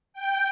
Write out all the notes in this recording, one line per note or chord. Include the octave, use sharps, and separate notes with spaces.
G5